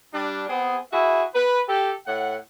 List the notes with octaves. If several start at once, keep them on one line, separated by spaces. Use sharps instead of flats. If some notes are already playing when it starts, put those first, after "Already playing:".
G3 D4
B3 C4 G#4
E4 F#4 G#4 E5
B4
G4 A4
A2 F#5